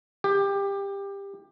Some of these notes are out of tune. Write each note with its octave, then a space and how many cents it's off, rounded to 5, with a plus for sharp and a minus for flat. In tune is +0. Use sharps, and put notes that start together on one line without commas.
G4 +20